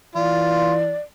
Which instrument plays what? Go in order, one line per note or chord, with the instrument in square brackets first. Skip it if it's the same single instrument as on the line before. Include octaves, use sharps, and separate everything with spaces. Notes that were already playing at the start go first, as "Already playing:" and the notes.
[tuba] E3 [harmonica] F4 [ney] D5